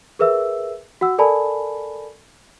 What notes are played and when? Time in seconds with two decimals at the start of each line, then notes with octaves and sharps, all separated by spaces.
0.19 G#4 A#4 B4 E5 E6
1.01 F#4 F#5 E6
1.18 A4 A#4 D5 G#5 A5 B5